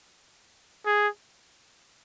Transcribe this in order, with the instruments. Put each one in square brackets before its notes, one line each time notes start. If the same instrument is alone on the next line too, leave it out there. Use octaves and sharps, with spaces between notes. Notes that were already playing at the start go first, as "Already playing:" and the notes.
[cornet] G#4